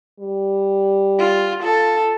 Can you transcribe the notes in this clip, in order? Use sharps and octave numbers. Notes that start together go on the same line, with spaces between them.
G3
F4
F4 A4